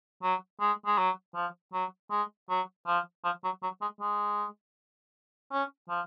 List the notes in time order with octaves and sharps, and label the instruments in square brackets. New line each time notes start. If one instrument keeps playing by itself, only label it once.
[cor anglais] F#3
G#3
G#3
F#3
F3
F#3
G#3
F#3
F3
F3
F#3
F#3
G#3
G#3
C#4
F3